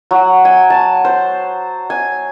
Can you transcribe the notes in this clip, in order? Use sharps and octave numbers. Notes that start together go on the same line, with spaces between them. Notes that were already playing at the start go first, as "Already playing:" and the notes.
F#3
G#5
A5
C5
G#5